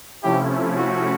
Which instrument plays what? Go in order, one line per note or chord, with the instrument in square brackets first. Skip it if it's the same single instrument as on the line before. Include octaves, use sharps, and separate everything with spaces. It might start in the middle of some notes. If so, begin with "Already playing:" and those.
[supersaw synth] C3 F3 A3 C#4 E4 [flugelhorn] G4
[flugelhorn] F#4